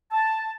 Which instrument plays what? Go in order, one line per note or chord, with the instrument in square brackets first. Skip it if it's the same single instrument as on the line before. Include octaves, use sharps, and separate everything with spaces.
[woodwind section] A5